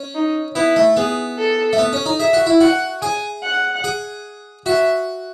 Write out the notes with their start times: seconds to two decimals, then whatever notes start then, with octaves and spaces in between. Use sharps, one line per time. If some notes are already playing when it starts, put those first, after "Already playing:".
Already playing: C#4
0.15 D#4
0.55 B3 E4
0.76 A3
0.97 B3 G#4
1.38 A4
1.73 A3
1.78 B3
1.93 C#4
2.06 D#4
2.20 G#4 E5
2.33 F#4
2.47 E4
2.60 F#4 F#5
3.02 G#4 G#5
3.43 F#5
3.84 G#4
4.66 F#4 E5